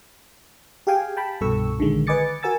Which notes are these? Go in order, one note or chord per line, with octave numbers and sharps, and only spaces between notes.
G4 G#4 F5 G5 G#5
G5 A5 B5
C2 G2 B2 A4 C#6 E6
A#1 D3 D#3 G#3
B4 D#5 G#5 D6 A6 C#7
F#4 A#4 G#5 E6 A6